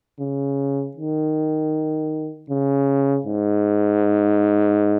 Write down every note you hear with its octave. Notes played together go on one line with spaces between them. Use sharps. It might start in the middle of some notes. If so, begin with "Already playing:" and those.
C#3
D#3
C#3
G#2